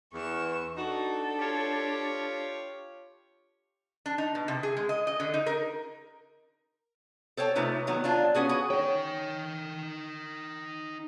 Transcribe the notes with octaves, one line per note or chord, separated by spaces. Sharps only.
E2 C#6 E7
D4 D#4 F#4 A4
F4 G4 C#5
D4
D#4
B2
C3
G#4
G#3
D#5
D#5
D3
D#4
A#4
A4 C5 C#5 G5
C3 A3 D#4 F4 B4
D#3 F#3 B3
F#3 D4 F4
B3 C#4 F#4 G#4
F#4 G#4
D#4 C#5 G5